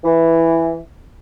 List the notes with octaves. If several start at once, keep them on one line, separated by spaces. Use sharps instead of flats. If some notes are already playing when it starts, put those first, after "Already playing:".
E3